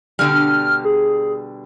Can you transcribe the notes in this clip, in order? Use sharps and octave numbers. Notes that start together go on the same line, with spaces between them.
B2 D3 G3 F6
G#4